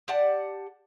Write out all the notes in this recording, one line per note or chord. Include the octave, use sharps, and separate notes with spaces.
G4 D5 F#5 A5